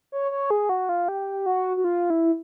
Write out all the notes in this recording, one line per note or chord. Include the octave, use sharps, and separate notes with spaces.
C#5
C#5
G#4
F#4
F4
G4
F#4
F#4
F4
E4